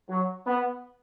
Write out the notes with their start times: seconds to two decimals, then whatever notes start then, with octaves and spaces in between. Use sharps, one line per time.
0.10 F#3
0.47 B3